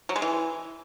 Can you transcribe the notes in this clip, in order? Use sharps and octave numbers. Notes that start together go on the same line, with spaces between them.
F#3
G#3
E3